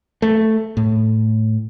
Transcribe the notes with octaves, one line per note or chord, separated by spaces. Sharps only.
A3
A2